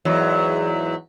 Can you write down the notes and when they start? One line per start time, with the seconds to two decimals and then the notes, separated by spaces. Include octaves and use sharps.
0.05 E2 G#2 F#3